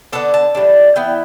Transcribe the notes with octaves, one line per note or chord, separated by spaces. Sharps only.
D3 B3 D4 A4
A5
A2 E3 G3 D4
E3 B3 E4 G5